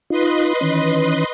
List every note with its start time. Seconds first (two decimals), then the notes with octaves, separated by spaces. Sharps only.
0.10 D#4 F4 B4 D#5 C6
0.61 D#3 E3 C#4